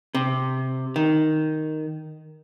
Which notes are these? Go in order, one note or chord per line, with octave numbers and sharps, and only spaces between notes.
C3
D#3